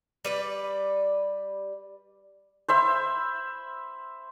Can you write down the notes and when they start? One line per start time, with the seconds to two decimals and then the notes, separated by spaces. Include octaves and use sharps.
0.25 G3 B4 D5
2.68 C5 E5 B5